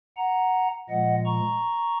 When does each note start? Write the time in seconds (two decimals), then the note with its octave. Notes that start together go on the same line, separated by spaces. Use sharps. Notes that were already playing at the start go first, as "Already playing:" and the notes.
0.17 F#5 A#5
0.89 A#2 F3 G#3 D#5 F#5
1.26 A#5 C#6